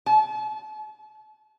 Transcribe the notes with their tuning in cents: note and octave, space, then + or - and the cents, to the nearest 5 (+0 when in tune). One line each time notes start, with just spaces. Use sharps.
A5 -45